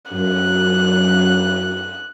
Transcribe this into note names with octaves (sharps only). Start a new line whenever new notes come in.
F#2 F#6